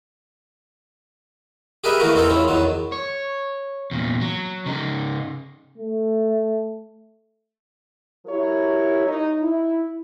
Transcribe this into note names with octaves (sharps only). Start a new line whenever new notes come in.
G4 G#4 A#4 B4 D#5 E5
D#3 E3 A3 A#3 F#4 A#4
E2 C4 D#4 A4 A#4 G5
F3 C#4 E4
B1 E2 D#3 F#3 B3
C#5
E2 A#2
F#3
C#3 D#4
A3
F#3 E4 G4 A#4 C#5
D#4
E4